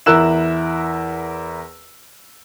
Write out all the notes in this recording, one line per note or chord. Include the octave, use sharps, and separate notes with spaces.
E2 E4 A#4 E6 F#6 E7